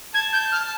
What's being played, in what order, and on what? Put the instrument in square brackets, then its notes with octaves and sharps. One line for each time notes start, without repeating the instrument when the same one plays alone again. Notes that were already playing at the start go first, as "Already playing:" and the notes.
[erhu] A5 [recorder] G#6
[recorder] G6
F6